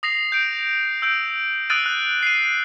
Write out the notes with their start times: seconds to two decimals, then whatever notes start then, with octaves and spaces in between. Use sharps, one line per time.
0.03 D#6 A#6 C7 F7
0.32 G6 D7
1.02 E6 G6 D7
1.70 D#6 E6 F#6 A6 D7 D#7
1.86 F#6
2.23 C7 D#7